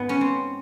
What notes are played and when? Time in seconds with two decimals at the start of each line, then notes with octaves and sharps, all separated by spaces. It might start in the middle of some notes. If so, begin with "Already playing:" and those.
Already playing: G#2 B3
0.09 C#4
0.21 C4